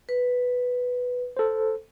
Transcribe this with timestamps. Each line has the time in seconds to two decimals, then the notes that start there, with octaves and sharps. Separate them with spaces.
0.09 B4
1.37 A4 C5